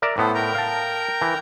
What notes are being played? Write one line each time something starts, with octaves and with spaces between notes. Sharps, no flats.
A#4 D5 E5
A2 B3 A4 C5
A#4 G5 A#5
F5 A5
E3